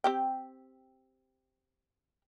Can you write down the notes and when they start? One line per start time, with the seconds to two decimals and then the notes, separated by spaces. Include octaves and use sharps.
0.04 C4 G4 G5